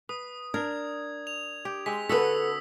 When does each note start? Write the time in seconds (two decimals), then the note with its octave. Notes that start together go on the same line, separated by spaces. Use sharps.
0.09 B4 D#6
0.54 D4 A#4 G#6
1.27 F7
1.65 G4
1.86 G#3 C4 B6
2.09 D3 F#4 A4 B4 D#6 E6 B6